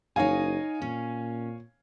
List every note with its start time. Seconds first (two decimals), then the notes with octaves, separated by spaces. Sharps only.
0.16 F#1 D#4 C#5 D#5 F5 G#5
0.82 A#2 C#4